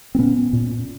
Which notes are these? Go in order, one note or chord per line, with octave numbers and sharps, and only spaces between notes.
C4
A#2 B3 C#4
A#2